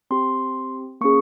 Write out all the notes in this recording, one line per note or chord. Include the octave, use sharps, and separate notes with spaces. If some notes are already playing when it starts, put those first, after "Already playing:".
C4 G4 C6
A#3 C#4 G#4 C#6